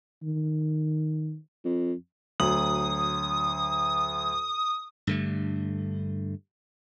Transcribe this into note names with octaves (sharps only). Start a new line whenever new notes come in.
D#3
F2
D2 F#3 D#6 F#7
G2 D3 A3